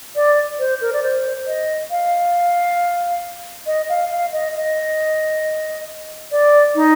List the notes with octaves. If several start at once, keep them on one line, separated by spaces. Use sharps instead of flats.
D5
C5
A#4
D5
C5
D#5
F5
D#5
F5
F5
D#5
D#5
D5
D#4